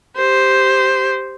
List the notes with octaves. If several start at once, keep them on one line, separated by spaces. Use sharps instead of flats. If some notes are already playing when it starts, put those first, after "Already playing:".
G4 C5